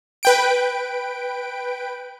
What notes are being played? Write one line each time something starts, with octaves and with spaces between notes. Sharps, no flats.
B4 G5 D7